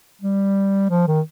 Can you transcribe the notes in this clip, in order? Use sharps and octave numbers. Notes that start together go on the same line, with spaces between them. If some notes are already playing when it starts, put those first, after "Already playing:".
G3
F3
D#3